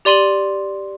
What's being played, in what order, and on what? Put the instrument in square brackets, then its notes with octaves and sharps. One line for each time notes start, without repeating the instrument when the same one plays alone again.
[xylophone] G4 D5 C6 D#7 F#7